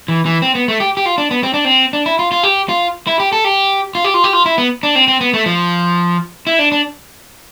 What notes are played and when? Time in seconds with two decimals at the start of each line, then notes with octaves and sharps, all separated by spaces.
0.08 E3
0.26 E3
0.42 C4
0.55 B3
0.68 A3
0.80 G4
0.97 G4
1.06 F4
1.18 D4
1.31 B3
1.43 C4
1.54 D4
1.65 C4
1.93 D4
2.06 E4
2.19 F4
2.32 F4
2.43 G4
2.69 F4
3.07 E4
3.20 G4
3.32 A4
3.44 G4
3.95 F4
4.05 G4
4.14 F4
4.24 G4
4.33 F4
4.46 E4
4.58 B3
4.83 D4
4.95 C4
5.08 C4
5.21 B3
5.33 A3
5.46 F3
6.47 E4
6.59 D4
6.72 D4